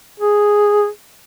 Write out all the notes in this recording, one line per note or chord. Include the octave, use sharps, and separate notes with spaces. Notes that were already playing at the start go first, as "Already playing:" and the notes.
G#4